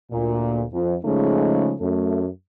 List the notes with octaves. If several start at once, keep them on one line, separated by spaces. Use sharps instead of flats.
D2 A#2
F2
C#3 F3 G#3 A3 D#4
F#2 A3